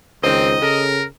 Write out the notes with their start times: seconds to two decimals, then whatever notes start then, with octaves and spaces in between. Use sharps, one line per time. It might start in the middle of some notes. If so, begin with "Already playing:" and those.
0.23 C#2 D#3 C4 C5 D#5
0.62 C#3 A4 A#4